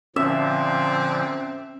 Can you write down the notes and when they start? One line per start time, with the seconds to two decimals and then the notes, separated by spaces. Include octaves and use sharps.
0.16 A#2 D3 F3 C4 C#4 E5